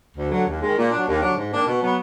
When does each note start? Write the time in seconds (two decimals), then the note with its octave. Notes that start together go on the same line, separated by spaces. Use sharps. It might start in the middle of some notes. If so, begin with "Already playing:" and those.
0.17 D2
0.32 D3 F#3
0.47 D#2
0.61 D#3 G#3
0.77 A#2
0.91 F#3 D4
1.07 D#2
1.22 D3 F#3 D4
1.36 G#2
1.51 D#3 A#3 D4
1.67 B2
1.81 F#3 B3